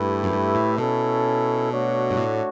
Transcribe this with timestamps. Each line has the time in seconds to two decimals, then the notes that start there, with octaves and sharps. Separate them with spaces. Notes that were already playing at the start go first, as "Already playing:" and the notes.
Already playing: G2 A3 E4 G4 B4
0.23 F#2
0.32 G2
0.55 A2
0.78 B2 C#4 E4 A4
1.71 A3 D4 F#4 C#5
2.11 G2
2.17 A2